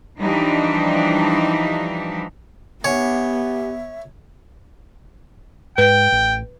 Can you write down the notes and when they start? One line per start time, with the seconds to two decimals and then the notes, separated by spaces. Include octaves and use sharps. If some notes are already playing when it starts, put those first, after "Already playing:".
0.21 E3 F3 G3 D4 D#4
2.84 B3 G4 C#5 E5 F#5 G#5
5.78 G#2 B4 G5
6.12 A1